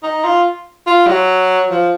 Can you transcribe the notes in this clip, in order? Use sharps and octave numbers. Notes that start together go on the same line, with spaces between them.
D#4
F4
F4
F#3
F3